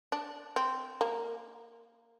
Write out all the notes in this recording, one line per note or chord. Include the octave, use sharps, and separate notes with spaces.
D4
C4
A#3